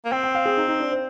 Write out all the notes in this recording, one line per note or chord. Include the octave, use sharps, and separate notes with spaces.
A#3
C4 G5
G5
F5
G#4
D#4
D#4
D4
C5